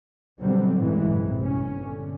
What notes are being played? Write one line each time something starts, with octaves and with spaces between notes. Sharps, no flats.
B2 D3 F#3 G3 C4
A1 G2 A#2 E3 G#3
A#1 C3
G1 C#4
D3